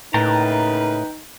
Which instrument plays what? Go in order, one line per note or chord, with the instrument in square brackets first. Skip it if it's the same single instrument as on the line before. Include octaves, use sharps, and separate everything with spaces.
[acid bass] A2 [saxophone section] C#3 A#3 B4 [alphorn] D#4 [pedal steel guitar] G5 A5 A#5